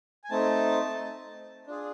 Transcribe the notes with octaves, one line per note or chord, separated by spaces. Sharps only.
G#5
A3 C4 D#4 A5
D4 F4 G#4